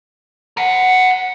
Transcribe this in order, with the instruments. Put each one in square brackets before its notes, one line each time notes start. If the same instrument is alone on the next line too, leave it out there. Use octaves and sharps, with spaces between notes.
[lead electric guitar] A#4 F#5